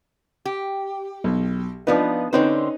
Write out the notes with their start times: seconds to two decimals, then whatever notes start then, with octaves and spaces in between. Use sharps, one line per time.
0.45 G4
1.24 B1
1.87 F3 B3 D4 D#4 F4 B4
2.33 D3 C4 C#4 D#4 B4 C5